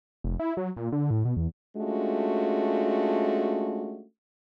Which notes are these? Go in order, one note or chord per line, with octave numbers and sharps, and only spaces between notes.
F1
E4
F#3
A#2
D3
A2
B2
E2
G#3 A3 C#4 D4 F4 F#4